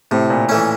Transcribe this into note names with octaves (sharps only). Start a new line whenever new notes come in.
A2 C3
A#2
E3 A3 C#4